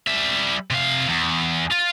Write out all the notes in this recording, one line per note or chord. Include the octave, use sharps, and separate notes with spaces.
G3 E5
C3 F5
E2
F4